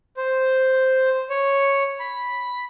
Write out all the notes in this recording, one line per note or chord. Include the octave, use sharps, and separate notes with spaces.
C5
C#5
B5